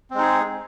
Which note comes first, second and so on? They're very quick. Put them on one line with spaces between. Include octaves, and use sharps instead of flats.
C4 G#3 D#4 G#4